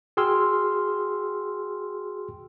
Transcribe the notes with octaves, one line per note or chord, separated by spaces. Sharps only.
F#4 G#4 G5 C6 E6 F6